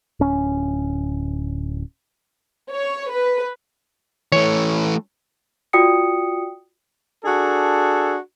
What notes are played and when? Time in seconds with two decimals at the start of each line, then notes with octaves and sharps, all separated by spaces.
0.20 D1 C#4
2.71 C#5
3.10 B4
4.32 E3 A3 C#5
5.73 F4 F#4 D5 G5 D#6 C#7
7.25 D4 F#4 G#4 A4